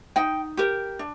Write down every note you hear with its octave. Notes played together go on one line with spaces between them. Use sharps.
D#4 G5
G4 A#4
D4